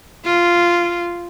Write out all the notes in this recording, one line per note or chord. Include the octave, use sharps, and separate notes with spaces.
F4